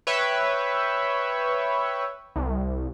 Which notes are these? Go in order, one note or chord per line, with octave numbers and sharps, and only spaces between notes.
B4 C#5 E5 G5
C2